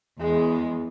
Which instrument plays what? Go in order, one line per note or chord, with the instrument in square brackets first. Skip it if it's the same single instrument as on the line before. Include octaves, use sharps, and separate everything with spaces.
[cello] E2 [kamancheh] G#3 G#4